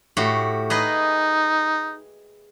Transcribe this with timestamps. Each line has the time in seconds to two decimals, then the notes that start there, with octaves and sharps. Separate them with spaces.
0.17 A2 F#4 G4
0.70 D#4 G#4 B4 D#5